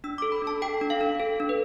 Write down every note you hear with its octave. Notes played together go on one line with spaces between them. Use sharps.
D4 E6
D6
A4
B5
D4
A5
A4 G5
D4
F5
D4
A4
D4
B4